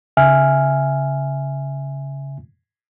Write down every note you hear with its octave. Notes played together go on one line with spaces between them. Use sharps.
C#3 E5 G#5 F6